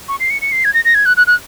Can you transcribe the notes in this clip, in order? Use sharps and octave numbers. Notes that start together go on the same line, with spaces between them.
C#6
C7
C#7
C#7
C7
G#6
A#6
A#6
G#6
F#6
F#6
F#6